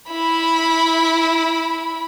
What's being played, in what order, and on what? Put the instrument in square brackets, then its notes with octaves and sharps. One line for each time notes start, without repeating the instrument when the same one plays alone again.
[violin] E4 B5